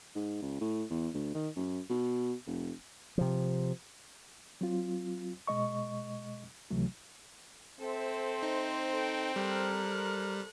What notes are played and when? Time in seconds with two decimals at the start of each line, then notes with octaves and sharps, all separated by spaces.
0.15 G#2
0.42 C#2
0.61 A2
0.90 E2
1.14 D2
1.34 D#3
1.56 F#2
1.90 B2
2.47 F1
3.18 C3 F3
4.61 F#3 C4 F4
5.47 B2 G#3 D#5 C#6
6.71 C#2 C3 E3 F#3 A3
7.80 C4 A4 C5 E5
8.43 D#4
8.91 A4 G5
9.36 G3 A4 A#4 C5 F#6